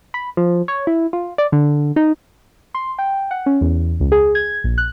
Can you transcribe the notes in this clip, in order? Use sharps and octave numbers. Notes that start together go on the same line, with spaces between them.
B5
F3
C#5
E4
F4
D5
D3
D#4
C6
G5
F#5
C#4
E2
C#2
G#4
G#6
A#1
F#6